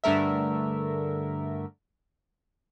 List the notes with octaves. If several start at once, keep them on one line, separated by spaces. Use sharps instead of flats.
G2 D3 A3 A#4 E5